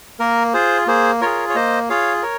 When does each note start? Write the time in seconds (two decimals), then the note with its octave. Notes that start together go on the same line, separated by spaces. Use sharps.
0.19 A#3 A#4
0.54 F4 G#4 C5
0.87 A#3 G#4 C5
1.21 F4 G#4 A#4 C#5
1.50 C#5
1.55 A#3 C5 D#5
1.89 F4 G#4 C#5 F5
2.23 A#4 C#5